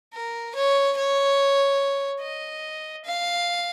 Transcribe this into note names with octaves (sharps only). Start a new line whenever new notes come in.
A#4
C#5
C#5
D#5
F5